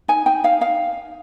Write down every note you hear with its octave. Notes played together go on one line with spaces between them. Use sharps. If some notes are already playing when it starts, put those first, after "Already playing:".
D#4 G#5
D#4 G5
D#4 F5
D#4 F5